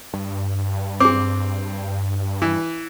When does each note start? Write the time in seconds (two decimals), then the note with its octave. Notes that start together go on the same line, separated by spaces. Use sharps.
0.14 G2
1.00 C4 G#4 D6
2.42 E3